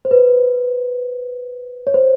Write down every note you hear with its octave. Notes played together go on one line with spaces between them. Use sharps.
C5
B4
C#5
C5